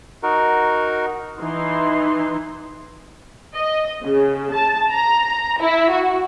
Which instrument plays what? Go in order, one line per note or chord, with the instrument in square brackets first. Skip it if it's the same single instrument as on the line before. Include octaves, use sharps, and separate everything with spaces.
[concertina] D#4 F#4 A#4
[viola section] E3 D#4 C6
[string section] D#5
C#3
A5
A#5
E4
F#4